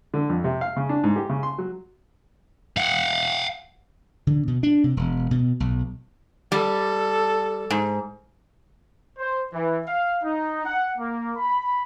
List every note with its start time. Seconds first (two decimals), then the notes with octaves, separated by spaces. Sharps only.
0.14 D3
0.30 F2
0.44 C3
0.61 F5
0.76 C#3
0.89 D4
1.04 G#2
1.16 G4
1.29 C#3
1.43 C6
1.58 F#3
2.77 F5 F#5
4.27 D3
4.48 B2
4.63 D4
4.84 C3
4.97 E1
5.31 B2
5.60 B1
6.52 G3 A4
7.71 G#2
9.18 C5
9.53 E3
9.87 F5
10.24 D#4
10.66 F#5
10.98 A#3
11.36 B5